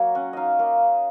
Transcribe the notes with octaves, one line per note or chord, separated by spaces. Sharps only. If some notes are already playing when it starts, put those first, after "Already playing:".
Already playing: F#3 A#3 C#5 D#5
C#4 F#5
D#4 D#5 F5
A#3